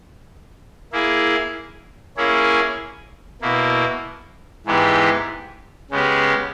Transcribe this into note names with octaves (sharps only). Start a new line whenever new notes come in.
A#3 E4 G#4
A#3 C#4 E4 G#4
B2 A#3 E4
G#2 E3 G#3 B3 G4
C#3 G#3 B3 G4